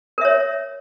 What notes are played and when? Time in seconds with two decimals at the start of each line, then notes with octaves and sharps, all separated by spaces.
0.18 A#4
0.21 E5
0.25 C#5